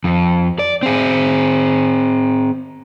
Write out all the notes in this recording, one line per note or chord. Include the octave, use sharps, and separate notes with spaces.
F2
D5
C4 G#4